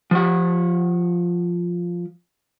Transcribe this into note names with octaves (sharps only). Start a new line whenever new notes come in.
F3 F#5